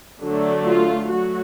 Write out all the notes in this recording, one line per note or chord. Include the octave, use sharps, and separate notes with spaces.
D3 F#3 A3 D4
F4
F#3 A3 F#4